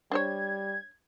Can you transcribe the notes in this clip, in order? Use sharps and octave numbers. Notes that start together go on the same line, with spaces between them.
G3 D4 C5 C#5 G#6